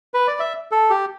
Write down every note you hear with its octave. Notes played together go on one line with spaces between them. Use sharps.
B4
D5
E5
A4
G4